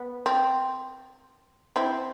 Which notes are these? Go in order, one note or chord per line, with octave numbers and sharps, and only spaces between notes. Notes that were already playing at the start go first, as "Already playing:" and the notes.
Already playing: B3
C4
C4 E4